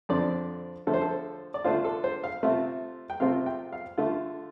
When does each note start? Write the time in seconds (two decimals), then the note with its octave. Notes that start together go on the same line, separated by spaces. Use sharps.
0.09 F2 D3 F3 C4 D5
0.87 D3 F3 A3 A4
0.94 C5
1.02 A4
1.54 D5
1.64 D3 A3 D4 F4 C5
1.84 A4
2.04 C5
2.24 F5
2.43 C3 A3 C4 F4
3.10 G5
3.20 C3 A3 C4 F4 F5
3.46 G5
3.73 F5
3.98 D3 A3 F4